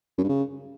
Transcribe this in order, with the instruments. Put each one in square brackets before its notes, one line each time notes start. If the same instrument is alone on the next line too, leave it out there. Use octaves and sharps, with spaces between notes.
[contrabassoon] F#2
G2
C#3